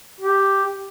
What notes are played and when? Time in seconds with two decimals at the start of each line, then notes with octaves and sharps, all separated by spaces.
0.20 G4